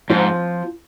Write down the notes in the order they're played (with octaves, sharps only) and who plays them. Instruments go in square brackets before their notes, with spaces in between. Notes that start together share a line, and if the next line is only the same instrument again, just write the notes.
[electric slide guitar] G#2 [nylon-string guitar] F3 C4 F4